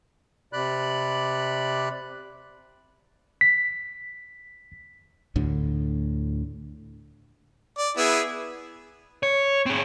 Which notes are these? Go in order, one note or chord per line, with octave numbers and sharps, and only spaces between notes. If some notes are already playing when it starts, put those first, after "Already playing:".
C3 D5 B5 F#6
B6
D2 A2 D3
D5
B3 E4 G#4
C#5
C4 G#4